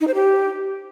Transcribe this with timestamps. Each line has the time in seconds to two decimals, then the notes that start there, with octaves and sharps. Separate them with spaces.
0.01 D#4
0.08 C5
0.14 G4